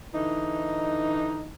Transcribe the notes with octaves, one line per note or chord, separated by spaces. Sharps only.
D3 E3 D#4